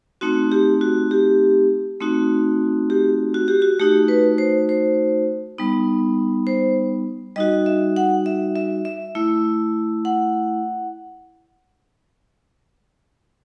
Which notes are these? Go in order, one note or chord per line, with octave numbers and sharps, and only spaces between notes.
A3 C4 D#4 F#4
G4
F#4
G4
A3 C4 D#4 F#4
G4
F#4
G4
F#4
A3 D#4 F#4 G4
B4
C5
C5
G3 B3 D#4
C5
G3 D#4 F#4 D#5
E5
F#5
E5
E5
E5
A3 E4
F#5